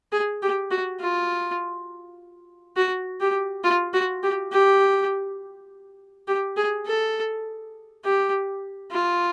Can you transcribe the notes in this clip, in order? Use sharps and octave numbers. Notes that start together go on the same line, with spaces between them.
G#4
G4
F#4
F4
F#4
G4
F4
F#4
G4
G4
G4
G#4
A4
G4
F4